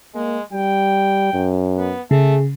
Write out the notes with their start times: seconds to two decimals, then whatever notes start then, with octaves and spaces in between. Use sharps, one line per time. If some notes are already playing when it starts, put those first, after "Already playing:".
0.15 G#3 A#3
0.53 G3 G5
1.34 F#2
1.77 B3
2.11 C#3 A3 G#4